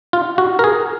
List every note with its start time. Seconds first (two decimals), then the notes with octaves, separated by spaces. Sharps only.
0.13 F4
0.38 F#4
0.59 A#4
0.64 G#4